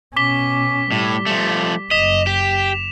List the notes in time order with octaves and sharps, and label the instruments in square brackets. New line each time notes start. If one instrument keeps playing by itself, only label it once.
[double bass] B2 C#4 [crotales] D6 B6 G7
[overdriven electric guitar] A2 [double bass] G3
[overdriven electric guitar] F3 A3
[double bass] F#1 [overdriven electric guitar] D#5 [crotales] B6 E7 F7
[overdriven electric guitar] G4